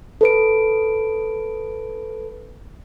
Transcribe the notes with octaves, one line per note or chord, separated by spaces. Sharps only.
A4 B4 D7